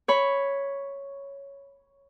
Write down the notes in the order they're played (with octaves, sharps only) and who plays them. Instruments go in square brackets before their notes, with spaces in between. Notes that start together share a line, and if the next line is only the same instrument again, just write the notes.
[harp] C#5 B5